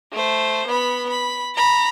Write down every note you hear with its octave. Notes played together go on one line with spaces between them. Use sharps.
A3 C5
B3 B5
B5
A#5 B5